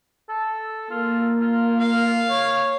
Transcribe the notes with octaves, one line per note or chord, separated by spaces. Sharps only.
A4
A#3 F4
F4
F5
C#5